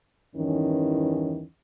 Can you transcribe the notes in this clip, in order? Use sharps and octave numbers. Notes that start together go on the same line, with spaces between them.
E2 G2 D#3 E3 C#4